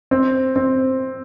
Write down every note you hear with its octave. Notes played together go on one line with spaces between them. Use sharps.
C4
C4